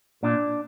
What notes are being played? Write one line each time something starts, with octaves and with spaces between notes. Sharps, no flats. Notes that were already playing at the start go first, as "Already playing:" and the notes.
A#2 D4